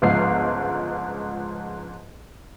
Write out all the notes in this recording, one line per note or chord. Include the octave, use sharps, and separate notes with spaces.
G1 C#2 G#2 F3 F4 C7